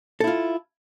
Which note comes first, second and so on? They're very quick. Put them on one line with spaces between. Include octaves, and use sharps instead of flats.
A4 E4 F4